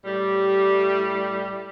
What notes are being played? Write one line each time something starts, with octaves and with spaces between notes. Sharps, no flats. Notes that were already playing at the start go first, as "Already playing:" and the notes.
A2 G3